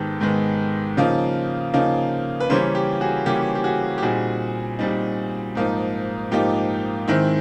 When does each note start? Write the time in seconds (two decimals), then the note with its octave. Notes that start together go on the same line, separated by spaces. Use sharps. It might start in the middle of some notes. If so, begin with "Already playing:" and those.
Already playing: G#2 D#3 G#3 B3 G4 A4
0.20 G#2 D#3 G#3 B3
0.97 C#3 F3 A#3 D#4
1.74 C#3 F3 A#3 D#4
2.40 B4
2.50 C#3 E3 G3 A#3 C#4 A#4 C5
2.75 G4
3.01 F#4 G#4
3.26 C#3 E3 G3 A#3 C#4 G4
3.55 G4
3.64 F#4 G#4
3.98 G4
4.02 A#2 G3 C4 D#4 F#4 G#4
4.79 A#2 G3 C4 D#4
5.55 G#2 F3 A#3 D#4
6.31 G#2 F3 A#3 D#4 G4
7.08 G#2 D#3 G#3 C4 E4